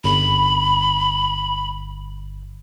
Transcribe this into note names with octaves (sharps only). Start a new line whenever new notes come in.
G1 B5